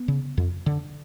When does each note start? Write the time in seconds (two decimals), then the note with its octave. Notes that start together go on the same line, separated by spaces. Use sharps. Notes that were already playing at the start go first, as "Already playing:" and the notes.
Already playing: B3
0.08 C#3
0.37 F2
0.66 D3